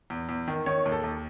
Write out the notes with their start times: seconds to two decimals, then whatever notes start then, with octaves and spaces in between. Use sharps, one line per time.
0.10 E2
0.29 E2
0.48 D#3
0.66 D#3 C#5
0.86 D#2
0.92 A4
1.04 D#2